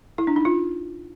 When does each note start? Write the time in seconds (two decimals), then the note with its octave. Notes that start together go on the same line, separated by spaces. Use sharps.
0.18 E4
0.27 D4
0.36 D#4
0.45 F4